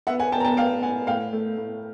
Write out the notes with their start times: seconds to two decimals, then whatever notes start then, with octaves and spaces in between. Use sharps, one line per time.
0.07 B3 E5 F#5
0.19 F#5 G#5
0.32 B3 G5 A5
0.40 A#5
0.44 G5 A5
0.57 B3 F5 G5
0.82 B3 F#5 G#5
1.07 A2 F5 G5
1.33 A3
1.57 A2